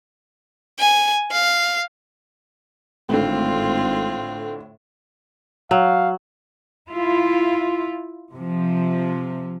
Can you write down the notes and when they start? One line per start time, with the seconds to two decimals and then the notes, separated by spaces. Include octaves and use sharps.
0.80 G#5
1.31 F5
3.09 G#1 A2 D3 C4 F4
5.71 F#3 F5
6.90 E4 F4
8.32 C3 F3